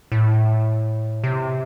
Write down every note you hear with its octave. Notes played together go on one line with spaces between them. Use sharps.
A2
C3